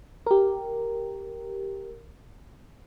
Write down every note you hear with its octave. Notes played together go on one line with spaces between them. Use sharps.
G4 A#4